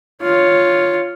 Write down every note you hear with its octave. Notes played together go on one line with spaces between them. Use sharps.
F4 C#5